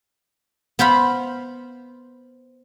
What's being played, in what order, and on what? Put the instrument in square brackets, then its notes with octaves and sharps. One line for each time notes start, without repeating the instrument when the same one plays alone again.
[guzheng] B3 C5 F5 B5